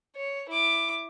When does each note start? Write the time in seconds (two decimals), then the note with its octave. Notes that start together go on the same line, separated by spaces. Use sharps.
0.16 C#5
0.49 E4 D6